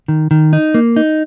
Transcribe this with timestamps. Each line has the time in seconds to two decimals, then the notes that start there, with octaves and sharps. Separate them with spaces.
0.08 D#3
0.31 D#3
0.53 D#4
0.74 A#3
0.96 D#4